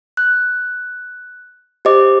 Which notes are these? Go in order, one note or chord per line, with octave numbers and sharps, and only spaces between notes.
F#6
G4 C5 D#5 D6